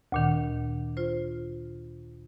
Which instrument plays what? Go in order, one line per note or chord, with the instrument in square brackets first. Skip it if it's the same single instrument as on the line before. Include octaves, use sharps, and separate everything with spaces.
[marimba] D2 A#2 D#3
F4 C5